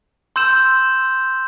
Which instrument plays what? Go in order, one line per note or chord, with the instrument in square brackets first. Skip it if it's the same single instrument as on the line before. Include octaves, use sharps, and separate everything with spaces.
[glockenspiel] C6 E6 G6 E7